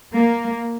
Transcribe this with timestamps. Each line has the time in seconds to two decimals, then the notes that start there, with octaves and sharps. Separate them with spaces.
0.14 A#3